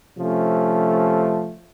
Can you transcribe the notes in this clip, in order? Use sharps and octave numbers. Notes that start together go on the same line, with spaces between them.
C3 F3 A3 C#4 A4